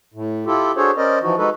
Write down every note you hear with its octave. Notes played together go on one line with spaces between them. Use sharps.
A2
E4 F4 G4 A4
D4 F#4 G#4 A4 C5 C#5
C#4 A#4 C5 D5 D#5
E3 F3 D#4 F#4
G#3 D#4 F#4 A4 B4